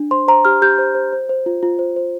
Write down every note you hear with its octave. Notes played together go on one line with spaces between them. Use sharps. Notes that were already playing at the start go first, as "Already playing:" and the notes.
Already playing: D4
C5 C6
C5 A#5
G4 F6
G4 G6
C5
C5
C5
C5
F4
F4
C5
C5